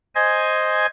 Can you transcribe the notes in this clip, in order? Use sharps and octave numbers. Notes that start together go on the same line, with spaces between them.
C5 D#5 G#5 G#6